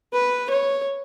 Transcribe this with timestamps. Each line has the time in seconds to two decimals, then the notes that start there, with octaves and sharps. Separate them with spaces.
0.13 B4
0.50 C#5